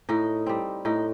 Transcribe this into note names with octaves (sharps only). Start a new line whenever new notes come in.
A2 D#4
G3 C4
A2 D#4